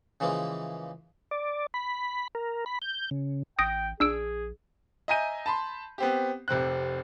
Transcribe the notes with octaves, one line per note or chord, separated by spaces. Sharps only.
C#3 E3 F3 G#3 A#3
D5
B5
A#4
B5
G6
C#3
A1 G5 D#6 A#6 D7
A#1 D4 G#4 E6 D7
D#5 E5 G#5 A#5 G6 D#7
A5 B5 C6
B3 C4 G4
F1 C3 C4 F#6